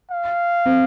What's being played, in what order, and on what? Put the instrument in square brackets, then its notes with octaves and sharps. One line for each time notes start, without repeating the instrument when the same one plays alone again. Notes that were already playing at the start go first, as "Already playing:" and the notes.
[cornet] F5
[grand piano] C4